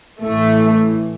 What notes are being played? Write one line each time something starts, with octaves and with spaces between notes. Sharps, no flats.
A1 A2 E3 A3